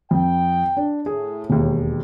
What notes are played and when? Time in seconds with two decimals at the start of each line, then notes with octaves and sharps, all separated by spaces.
0.11 F2 G5
0.77 D4
1.06 A2 G#4
1.50 E1 D#2